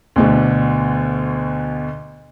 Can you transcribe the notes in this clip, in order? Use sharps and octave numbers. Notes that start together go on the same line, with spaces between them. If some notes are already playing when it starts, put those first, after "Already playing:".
D2 B2 D3